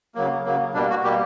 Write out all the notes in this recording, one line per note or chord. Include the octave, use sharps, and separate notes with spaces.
C#3 F#3 A#3
C#3 F#3 A#3
B2 G3 A#3 D4
F#4
B2 G3 A#3 G4